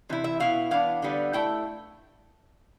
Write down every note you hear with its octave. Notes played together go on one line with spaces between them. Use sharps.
C3 E3 E4
E5
B2 B3 E4 F5
E3 B3 D4 F5
D3 G3 B3
A3 E4 G5